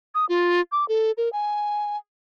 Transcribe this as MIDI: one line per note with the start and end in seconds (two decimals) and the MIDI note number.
0.15 0.25 87
0.29 0.61 65
0.72 0.87 86
0.88 1.12 69
1.17 1.31 70
1.33 1.97 80